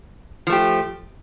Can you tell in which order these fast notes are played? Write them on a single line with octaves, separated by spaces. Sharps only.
F3 A3 G4